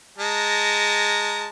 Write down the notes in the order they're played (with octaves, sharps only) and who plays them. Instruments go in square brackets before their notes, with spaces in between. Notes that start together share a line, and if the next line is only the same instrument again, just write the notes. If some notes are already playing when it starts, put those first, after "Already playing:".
[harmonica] G#3 A5 A#5